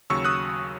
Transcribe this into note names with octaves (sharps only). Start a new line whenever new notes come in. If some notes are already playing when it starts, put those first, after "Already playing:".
D#2 C#3 F#3 C#6 E6
D#6 F#6